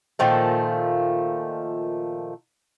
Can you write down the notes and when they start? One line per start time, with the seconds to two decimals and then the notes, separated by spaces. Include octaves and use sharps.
0.19 A#2 D#3 F3 A3